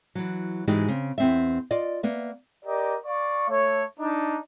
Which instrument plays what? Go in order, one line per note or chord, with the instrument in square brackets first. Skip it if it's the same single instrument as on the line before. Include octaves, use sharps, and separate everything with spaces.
[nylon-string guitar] E3 F#3
G#2 E3 G#3 D#4 F#4 G4
C#3 C4
E2 C4 E5
F4 D5 D#5
A#3 B3 E5
[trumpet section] G4 A#4 D5 D#5
D5 F5 C#6
A3 C#5
D4 D#4